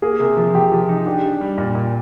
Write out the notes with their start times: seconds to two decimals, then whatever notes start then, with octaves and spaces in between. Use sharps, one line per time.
0.02 A#3 G#4
0.20 C3
0.37 F3
0.54 C3 G4
0.72 F3
0.89 D#4
1.06 D4 G4
1.23 D4
1.41 G3
1.58 A#2
1.75 A#2